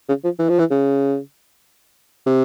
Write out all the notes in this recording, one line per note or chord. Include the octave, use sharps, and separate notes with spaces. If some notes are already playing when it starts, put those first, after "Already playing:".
C#3
F3
E3
F3
E3
C#3
C3